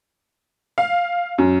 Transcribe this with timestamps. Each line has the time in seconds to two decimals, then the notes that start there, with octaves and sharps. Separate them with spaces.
0.78 F5
1.38 F#2